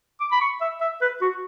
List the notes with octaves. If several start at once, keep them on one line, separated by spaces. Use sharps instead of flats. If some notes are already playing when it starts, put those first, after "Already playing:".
D6
B5
C#6
E5
E5
B4
F#4